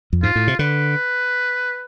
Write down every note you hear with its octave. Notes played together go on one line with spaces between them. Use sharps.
F2
G#2 F4
A2
C3
D3 B4